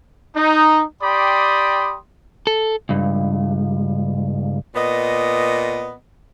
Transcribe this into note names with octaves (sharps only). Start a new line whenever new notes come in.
D#4
G4 D5 G5 B5 C6 D#6
A4
C#2 G2
A#2 B3 D#5